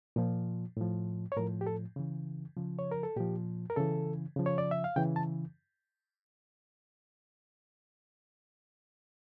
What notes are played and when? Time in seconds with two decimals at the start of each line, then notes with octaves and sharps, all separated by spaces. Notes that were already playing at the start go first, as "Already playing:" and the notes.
0.16 A#2 F3
0.77 A2 F3
1.32 C#5
1.36 A2 F3 A#4
1.61 G4
1.67 A4
1.96 C#3 E3
2.57 C#3 F3
2.79 C#5
2.91 A#4
3.03 A4
3.16 A#2 F3 G4
3.70 A#4
3.76 C#3 E3 A4
4.36 C#3 F3
4.46 C#5
4.58 D5
4.71 E5
4.84 F5
4.96 C#3 E3 G5
5.16 A5